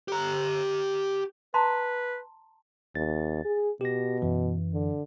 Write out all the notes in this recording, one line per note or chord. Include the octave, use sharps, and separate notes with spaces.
G4 A#5
B4 A5 A#5 C6
D#2 A6
G#4
B2 G4 A#6
F#2 E3
D3